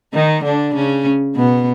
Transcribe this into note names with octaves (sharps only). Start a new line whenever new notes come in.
D#3 D#4
D3 D4
C#3 C#4
B2 B3